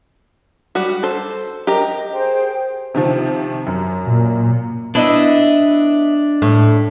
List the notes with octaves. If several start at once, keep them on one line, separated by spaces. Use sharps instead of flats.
G3 F#4
A4 C5
G4 A#4 D#5
G#4 C5 G5
C3 D#3 F3
F#2
A#2
B3 D4 E4 D#5 E5
A2